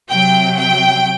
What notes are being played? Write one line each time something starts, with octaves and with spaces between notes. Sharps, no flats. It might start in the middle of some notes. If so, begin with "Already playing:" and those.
C3 F#3 G5
G5